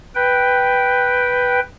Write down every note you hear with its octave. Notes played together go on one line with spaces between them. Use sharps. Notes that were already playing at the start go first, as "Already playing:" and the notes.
B4 G5